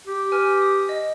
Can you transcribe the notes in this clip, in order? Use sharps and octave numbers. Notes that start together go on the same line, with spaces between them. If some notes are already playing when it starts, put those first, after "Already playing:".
G4
B4 G#5 F6
D#6
D#5